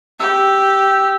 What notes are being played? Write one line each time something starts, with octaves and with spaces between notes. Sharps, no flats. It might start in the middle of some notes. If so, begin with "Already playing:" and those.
G4 E6